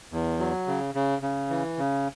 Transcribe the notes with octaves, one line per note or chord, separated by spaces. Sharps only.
E2
F#3
C#3
C#3
C#3
E3
C#3